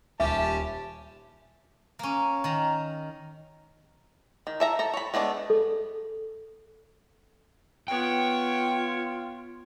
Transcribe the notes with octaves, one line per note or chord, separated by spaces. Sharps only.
D#1 C#4 G4 E5 A5
A#3 C#4
D#3 A#5
D#3
A4 E5 A#5
A4 A#5
C#5 B5
G#3 A3 B3 D4
A4
B3 F4 C#5 G5